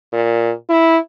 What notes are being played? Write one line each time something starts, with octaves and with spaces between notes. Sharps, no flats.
A#2
E4